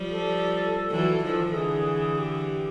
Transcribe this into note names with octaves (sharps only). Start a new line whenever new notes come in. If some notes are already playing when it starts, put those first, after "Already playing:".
Already playing: F3 G3
A4
E3 F#3
D#3 F3
D3 E3 G#4
G4